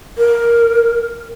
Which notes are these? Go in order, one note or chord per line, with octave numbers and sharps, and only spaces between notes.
A#4